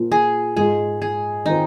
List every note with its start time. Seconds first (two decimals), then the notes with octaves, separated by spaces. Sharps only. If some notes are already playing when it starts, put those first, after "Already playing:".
Already playing: A#2 F3 A#3
0.12 G#4
0.56 G#2 G#3 F4 G#4
1.02 G#4
1.46 D#3 C4 D#4 F4